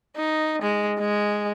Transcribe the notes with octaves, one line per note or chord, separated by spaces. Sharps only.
D#4
G#3
G#3